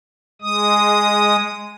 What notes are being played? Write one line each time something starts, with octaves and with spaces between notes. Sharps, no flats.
G#3 D#6